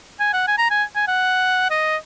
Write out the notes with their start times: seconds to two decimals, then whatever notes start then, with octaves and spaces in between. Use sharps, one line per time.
0.20 G#5
0.33 F#5
0.47 G#5
0.58 A#5
0.70 G#5
0.96 G#5
1.08 F#5
1.70 D#5